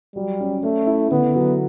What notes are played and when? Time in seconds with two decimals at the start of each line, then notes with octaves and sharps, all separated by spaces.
0.15 F#3 G3
0.40 C#4
0.63 A3 C#4
0.87 E4
1.11 D3 B3
1.35 F#3